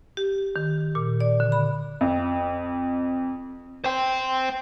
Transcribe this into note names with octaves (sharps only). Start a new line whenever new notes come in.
G4
D#3
A#2
D5
D3
B5
F2
C5 G5